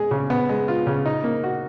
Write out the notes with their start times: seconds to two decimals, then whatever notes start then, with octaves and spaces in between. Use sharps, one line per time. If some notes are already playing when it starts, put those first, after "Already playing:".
Already playing: G#3 G#4
0.11 C#3
0.30 B3
0.49 G#3
0.68 F4
0.87 C#3
1.06 D#4
1.24 A#3
1.44 F#4